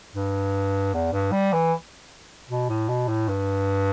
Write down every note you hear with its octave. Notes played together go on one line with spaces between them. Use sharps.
G2
E2
G2
G3
E3
B2
A2
B2
A2
G2